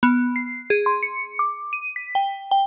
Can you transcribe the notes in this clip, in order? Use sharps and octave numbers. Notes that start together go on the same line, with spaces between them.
B3
C7
G#4
C6
C#7
D6
D#7
B6
G5
G5